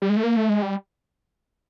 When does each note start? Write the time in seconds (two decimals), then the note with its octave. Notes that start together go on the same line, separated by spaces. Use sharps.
0.02 G3
0.10 G#3
0.17 A3
0.23 A#3
0.36 A3
0.49 G#3
0.62 G3